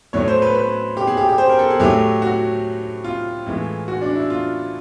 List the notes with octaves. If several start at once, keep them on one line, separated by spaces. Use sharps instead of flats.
A2 F#3 A3 C#5
C5
B4
B4
G4
G#4
G4
G4
C5
A#4
A4
G#4
A2 F#3 A3 G4
F#4
F4
A2 E3 G#3
F#4
D4
E4
F4